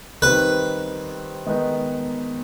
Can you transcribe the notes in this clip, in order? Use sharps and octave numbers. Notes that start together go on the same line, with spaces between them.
D#3 G3 C4 B4
D#3 G#3 B3 D#4